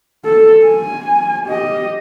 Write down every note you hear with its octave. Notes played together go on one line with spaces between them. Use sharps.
A4
G#5
G4 D#5